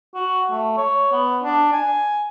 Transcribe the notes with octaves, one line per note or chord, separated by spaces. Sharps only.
F#4
A3
C#5
B3
D4
G#5